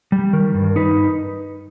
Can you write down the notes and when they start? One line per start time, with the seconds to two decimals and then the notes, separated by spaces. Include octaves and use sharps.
0.12 G3
0.33 D#3 A#4
0.54 G2
0.76 D#4 B4